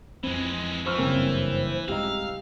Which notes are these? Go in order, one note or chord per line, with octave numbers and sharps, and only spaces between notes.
F2 E3 G#3 C4
E3 C5 C#6 E6 F6
F#1 G2 C#3 A#3 C4
C2 G#2 D#4 G4 F5 E6